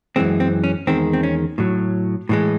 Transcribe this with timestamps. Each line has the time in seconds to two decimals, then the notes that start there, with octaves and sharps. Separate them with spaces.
0.16 F#2 E3 G#3 C4
0.40 C4
0.64 C#4
0.87 E2 D#3 G#3 C4
1.13 C4
1.23 C#4
1.58 A2 F#3
2.29 A2 E3 G#3